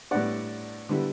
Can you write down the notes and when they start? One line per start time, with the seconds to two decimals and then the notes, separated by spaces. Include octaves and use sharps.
0.11 A2 G3 B3 D4 D5 F#5
0.89 D3 G3 B3 E4